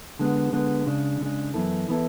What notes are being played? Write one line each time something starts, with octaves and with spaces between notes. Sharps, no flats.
D3 G#3 B3
D3 G#3 B3
C#3 G#3 D4
C#3 G#3 D4
F#2 E3 B3 E4 A4
E3 B3 E4 A4